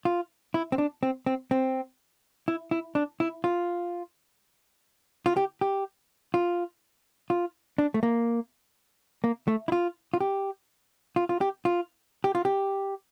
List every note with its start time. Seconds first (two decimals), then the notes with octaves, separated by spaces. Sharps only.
0.05 F4
0.54 E4
0.72 C4
0.78 D4
1.03 C4
1.26 C4
1.51 C4
2.48 E4
2.71 E4
2.95 D4
3.20 E4
3.44 F4
5.26 F4
5.37 G4
5.61 G4
6.34 F4
7.30 F4
7.78 D4
7.94 A3
8.03 A#3
9.24 A#3
9.48 A3
9.68 E4
9.72 F4
10.14 F4
10.21 G4
11.16 F4
11.29 F4
11.41 G4
11.65 F4
12.24 G4
12.35 F4
12.45 G4